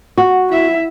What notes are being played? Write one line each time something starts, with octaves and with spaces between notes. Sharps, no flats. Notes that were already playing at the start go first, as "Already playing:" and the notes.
F#4
E4 E5